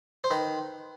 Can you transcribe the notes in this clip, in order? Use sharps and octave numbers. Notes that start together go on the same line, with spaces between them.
C5
D#3 B4